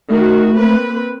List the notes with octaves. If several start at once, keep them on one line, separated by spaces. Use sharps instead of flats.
D#3 A3 F#4
A#3 C4 B4